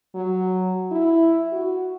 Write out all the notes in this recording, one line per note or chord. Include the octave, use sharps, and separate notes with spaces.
F#3
E4
F#4